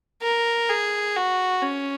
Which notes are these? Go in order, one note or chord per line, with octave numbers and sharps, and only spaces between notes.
A#4
G#4
F#4
C#4